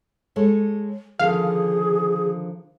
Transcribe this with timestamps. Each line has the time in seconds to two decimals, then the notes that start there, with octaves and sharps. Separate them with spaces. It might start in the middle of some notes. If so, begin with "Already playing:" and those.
0.36 G#3 A4 C#5
1.19 D3 D#3 F3 G#4 F5